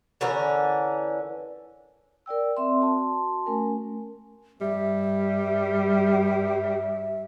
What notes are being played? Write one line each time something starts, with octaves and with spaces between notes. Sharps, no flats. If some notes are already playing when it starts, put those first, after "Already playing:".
D3 E3 C#4 A#4
A#4 D5 G5 E6
C4 D5 E5 C6
F#4 A5 C6
A3 C#4 A#4 G#5
G2 G3 E5